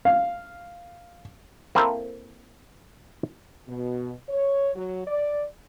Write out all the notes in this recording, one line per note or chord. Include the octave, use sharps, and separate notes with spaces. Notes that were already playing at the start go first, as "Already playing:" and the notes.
F5
A#3 C4 E4 A4 A#4 C5
B2
C#5
F#3
D5